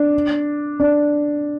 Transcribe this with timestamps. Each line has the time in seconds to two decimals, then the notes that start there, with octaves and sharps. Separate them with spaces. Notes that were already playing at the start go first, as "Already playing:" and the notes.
Already playing: D4
0.80 D4